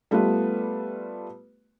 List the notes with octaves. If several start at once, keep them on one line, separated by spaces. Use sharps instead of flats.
G3 A3 B3 F4 B4